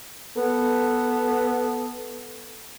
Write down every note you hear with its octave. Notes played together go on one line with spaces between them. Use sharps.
B3 A4